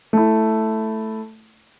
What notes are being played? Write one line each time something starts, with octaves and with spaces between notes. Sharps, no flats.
A3 E4